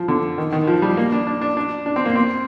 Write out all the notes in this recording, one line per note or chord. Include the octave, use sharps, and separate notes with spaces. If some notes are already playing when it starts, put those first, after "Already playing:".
Already playing: F3
D3
D#3
D#3
F3
G3
A#3
D4
D4
D4
D4
D4
C4
A#3
C4